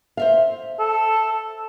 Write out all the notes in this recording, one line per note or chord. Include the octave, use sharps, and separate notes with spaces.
C5 E5 F5
A4